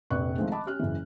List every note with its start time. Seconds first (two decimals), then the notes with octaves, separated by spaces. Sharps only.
0.10 F1 A#1 B4 D5 C#6 F#6
0.37 C3 D#3 F3 G#3 A3 C4
0.51 D#5 A5 B5 D6
0.66 C#4 G4 F6 F#6
0.79 F#1 E3